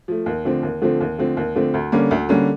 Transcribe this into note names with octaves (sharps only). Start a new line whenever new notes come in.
F3 A3
D#2
D3 F3 A3 C4
D#2
D3 F3 A3 C4
D#2
D3 F3 A3 C4
D#2
D3 F3 A3 C4
D2
D3 G3 A#3 C#4
D2
D3 G3 A#3 C#4